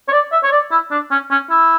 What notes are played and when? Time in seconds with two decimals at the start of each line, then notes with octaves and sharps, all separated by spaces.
0.08 C#5
0.12 D5
0.32 E5
0.43 C#5
0.52 D5
0.71 E4
0.91 D4
1.11 C#4
1.31 C#4
1.50 E4